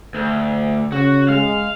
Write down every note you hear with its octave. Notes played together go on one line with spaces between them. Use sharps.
D2
C#3 F#4
G#3 F5